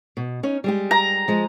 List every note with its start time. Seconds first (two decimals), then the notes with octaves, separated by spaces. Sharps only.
0.17 B2
0.43 C#4 D#4
0.64 G3 G#3 G4
0.91 A#5
1.28 F3 G#3